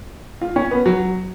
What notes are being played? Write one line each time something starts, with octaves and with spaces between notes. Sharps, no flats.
F4
C#4
B3
F#3